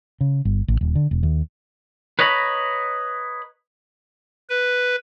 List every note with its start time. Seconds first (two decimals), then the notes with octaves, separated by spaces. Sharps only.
0.21 C#3
0.45 G1
0.68 A1
0.81 D#1
0.95 D3
1.11 E1
1.23 D#2
2.19 B4 C#5 D#5 A#5 B5
4.50 B4